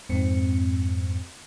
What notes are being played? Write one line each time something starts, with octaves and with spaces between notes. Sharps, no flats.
F2 G#2 C4 C#7